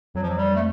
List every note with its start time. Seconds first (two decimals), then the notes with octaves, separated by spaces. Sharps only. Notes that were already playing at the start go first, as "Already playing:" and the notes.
0.15 F2 F#3
0.23 F3
0.30 F#3
0.38 G3
0.55 A3